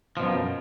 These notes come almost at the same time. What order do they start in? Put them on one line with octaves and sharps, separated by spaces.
F3 B2 F#2